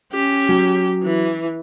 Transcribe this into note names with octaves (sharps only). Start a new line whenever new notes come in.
C#4 G4
F#3
E3